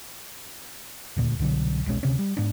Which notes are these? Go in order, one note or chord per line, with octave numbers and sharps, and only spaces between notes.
D#1 D2 A#2
C2 B2 D3 F#3
D#1 B1 G#3 C#4
D2 C3 C#4
G3
G#2 B3 D4